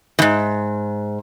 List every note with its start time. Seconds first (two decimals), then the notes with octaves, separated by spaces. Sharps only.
0.19 E2 G#2